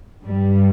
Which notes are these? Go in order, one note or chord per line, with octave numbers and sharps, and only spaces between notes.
G2 G3